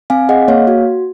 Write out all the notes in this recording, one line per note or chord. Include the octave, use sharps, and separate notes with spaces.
C4 F5 G#5
G#4 D#5 F#5
A#3 C#5 F5
F#4